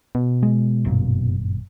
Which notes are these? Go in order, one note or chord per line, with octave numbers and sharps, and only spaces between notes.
B2
G#3
G1 F#2 A#2